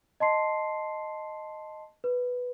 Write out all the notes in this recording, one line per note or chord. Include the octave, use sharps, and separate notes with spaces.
D#5 A5 C6 C7
B4